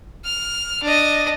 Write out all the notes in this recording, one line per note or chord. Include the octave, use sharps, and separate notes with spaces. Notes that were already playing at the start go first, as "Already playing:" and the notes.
F6
D4 D#5